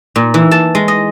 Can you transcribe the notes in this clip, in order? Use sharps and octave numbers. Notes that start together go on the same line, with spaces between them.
A#2
E3
A5
G#3
D#5